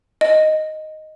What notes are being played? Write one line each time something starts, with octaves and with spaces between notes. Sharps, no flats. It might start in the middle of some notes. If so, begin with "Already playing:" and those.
D#5